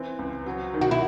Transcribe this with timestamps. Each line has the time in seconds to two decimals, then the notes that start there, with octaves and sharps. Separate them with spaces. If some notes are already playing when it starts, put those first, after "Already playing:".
Already playing: E3 C4
0.19 C#2
0.46 F#3
0.74 D#3
0.81 F#4
0.91 E4